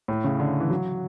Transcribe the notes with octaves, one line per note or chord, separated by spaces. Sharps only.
A2
C#3
D3
E3
F#3